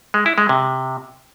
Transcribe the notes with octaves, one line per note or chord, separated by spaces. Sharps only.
G#3
E4
G#3
C3